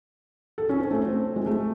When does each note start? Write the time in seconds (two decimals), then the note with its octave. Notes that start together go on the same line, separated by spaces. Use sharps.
0.58 A4
0.69 C#4
0.80 C4
0.91 A3
1.02 C4
1.36 G#3
1.46 A3